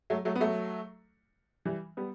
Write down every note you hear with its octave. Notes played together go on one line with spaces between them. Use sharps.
F#3 A3
F#3 A3
B3
F#3 A3
E3 G3
G3 B3